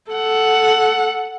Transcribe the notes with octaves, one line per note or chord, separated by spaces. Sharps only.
A4 F#5